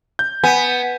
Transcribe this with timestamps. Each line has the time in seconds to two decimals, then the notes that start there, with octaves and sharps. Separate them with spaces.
0.19 G6
0.44 B3 G#5